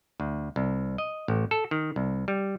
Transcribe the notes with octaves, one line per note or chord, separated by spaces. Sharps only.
D2
C2
D#5
A1
A4
D#3
C2
G3